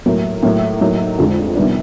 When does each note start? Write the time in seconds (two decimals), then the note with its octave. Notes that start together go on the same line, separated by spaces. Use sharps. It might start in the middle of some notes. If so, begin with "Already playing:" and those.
0.06 A2 F#3 A#3
0.43 A2 F#3 A#3
0.81 A2 F#3 A#3 D#4
1.18 F2 D3 F3 G#3
1.55 C3 D#3 G3 B3 D4